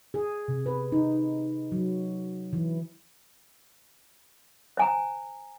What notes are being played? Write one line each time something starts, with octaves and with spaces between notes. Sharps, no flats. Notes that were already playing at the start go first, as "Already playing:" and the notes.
G#4
C3
B4
D#4
F#3
E3
C5 G#5 A#5